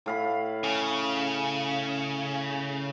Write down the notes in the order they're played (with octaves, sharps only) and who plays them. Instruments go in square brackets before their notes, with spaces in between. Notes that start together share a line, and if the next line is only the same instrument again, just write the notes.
[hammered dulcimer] A2 F5 B5
[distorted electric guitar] C#3